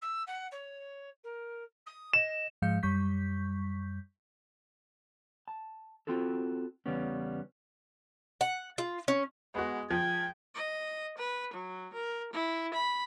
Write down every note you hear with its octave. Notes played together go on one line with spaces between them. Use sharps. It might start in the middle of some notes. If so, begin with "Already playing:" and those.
E6
F#5
C#5
A#4
D#6
D#5 E7
G#2 F3 G#3 F5 G6 C#7
F#2 G3 C#6 G6 B6
A5
C4 F4 F#4 A4
E2 C#3 E3 G3 B3 C#4
F#5
F4
C#4
G#3 B3 F#4
F3 G5 G#6
D#5
B4
F#3
A#4
E4
B5